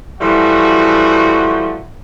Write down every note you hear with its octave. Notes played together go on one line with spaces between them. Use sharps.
E3 F3 G3 A3 F#4